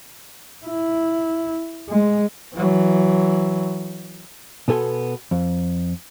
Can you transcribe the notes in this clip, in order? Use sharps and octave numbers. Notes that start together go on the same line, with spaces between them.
E4
G#3
E3 F#3
B2 B3 A4 G#5 C6
F2